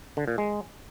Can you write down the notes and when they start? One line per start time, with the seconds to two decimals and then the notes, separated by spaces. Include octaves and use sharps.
0.17 D3
0.28 A#2
0.38 G#3